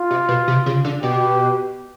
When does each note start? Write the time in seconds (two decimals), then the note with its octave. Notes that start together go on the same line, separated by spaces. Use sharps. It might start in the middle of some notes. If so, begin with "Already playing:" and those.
Already playing: F4
0.11 C3
0.29 B2
0.48 C3
0.66 C#3
0.84 D3
1.02 B2 G4